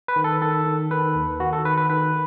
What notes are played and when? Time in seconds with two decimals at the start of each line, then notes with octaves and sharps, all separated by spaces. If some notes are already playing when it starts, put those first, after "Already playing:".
0.08 B4
0.16 D#3
0.24 A4
0.41 D#3 A4
0.66 D#3
0.91 D#3 B4
1.15 D#2
1.40 D#3 F#4
1.53 A4
1.65 D#3 B4
1.77 B4
1.90 D#3 B4